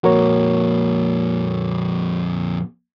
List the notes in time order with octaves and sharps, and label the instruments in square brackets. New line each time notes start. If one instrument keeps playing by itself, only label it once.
[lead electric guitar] F2 A#2 [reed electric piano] F#4 A#4 C#5